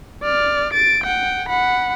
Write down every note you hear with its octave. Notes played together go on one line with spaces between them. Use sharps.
D5 F6
A6 D7
F#5 G5
F#5 B5